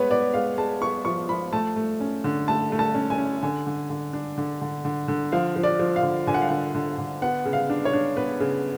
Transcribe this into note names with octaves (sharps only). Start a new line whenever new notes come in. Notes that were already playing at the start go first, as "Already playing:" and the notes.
Already playing: G#3 B3 B4 C#5
B3 D5
G#3 F5
G#3 A5
B3 C#6
F3 C#6
F3 B5
A3 A5
A3
C#4
D3
A3 A5
A3
A5
C#4
G#5
C#4
D3 G#5
D3
D3
D4
D3
D3
D3
D3
F3 F5
F3
D5
F3
F5
D3
D3 G#5
F#5
F5
D3 F#5
D3
D3
B3 F#5
C#3
F5
D4
C#5
D4
B3 B4
C#3